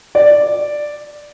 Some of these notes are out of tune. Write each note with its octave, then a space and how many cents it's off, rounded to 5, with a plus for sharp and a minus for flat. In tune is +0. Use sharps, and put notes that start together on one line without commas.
D5 +5